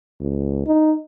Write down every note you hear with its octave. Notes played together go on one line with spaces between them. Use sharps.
C#2
D#4